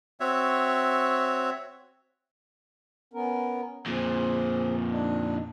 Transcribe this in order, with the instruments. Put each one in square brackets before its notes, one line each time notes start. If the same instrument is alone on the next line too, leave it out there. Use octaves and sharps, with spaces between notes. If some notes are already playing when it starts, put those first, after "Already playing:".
[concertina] C4 F#4 C#5 E5
[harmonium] B3 C#4 A#4
[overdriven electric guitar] F2 A#2 [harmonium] F3 G#4
[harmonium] D4 D#4